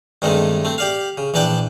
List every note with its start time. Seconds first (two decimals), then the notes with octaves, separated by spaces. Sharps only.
0.22 G2 C3 D#3 G#3 A3
0.65 A3 C4
0.78 G4 D5 F5
1.18 C#3
1.34 A#1 E3 D4 D5 G5